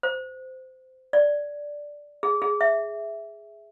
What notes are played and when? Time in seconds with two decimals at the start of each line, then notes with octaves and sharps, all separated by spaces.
0.03 C5
1.13 D5
2.23 G#4
2.42 G#4
2.61 E5